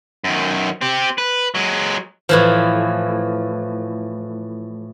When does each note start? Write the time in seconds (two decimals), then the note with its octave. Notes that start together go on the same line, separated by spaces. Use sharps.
0.24 F#2 D#3
0.81 C4 G4
1.18 B4
1.55 F#3 G#3
2.29 A2 E3 F3